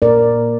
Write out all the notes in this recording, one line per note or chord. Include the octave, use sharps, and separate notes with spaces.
A#2 A#4 D5